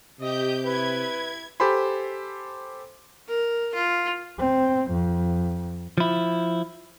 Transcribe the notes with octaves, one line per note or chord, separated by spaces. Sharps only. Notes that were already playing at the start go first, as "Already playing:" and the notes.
C3 G4 D#5 G6
E4 B4 G#6
G4 A4 C5 G#5 B5 C6
A#4
F4
C4
F2
F3 E4